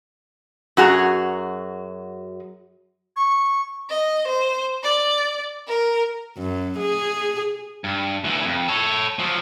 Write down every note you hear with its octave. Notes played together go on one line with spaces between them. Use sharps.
F#2 F#4 G#4 A#5
C#6
D#5
C5
D5
A#4
F#2
G#4
G2
D2 E3
F2
A4 C#5
F3 F#3